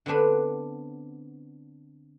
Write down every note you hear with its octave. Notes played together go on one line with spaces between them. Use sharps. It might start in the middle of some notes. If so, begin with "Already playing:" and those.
D3 B3 C4 D4 B4